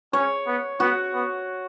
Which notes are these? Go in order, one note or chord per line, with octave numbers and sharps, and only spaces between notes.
C#4 C#5
B3
B3 F#4
B3